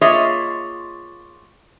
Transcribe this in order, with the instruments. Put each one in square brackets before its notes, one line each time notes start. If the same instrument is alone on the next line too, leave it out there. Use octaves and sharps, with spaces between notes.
[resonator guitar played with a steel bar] A#3 F4 G#4 C#5 D#5 E5